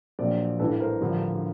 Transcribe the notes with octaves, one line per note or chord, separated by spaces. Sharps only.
A#1 A#2 F#3 C5 D5
A1 G2 E3 A4 B4
A#4 C5
A1 G2 D3 F3